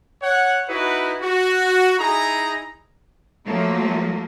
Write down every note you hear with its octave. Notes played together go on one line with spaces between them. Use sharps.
C#5 F#5
D#4 E4 F#4 B4
F#4
D#4 E4 G#4 A#5
F3 F#3 A3 A#3